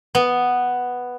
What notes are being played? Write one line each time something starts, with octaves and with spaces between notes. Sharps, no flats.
B3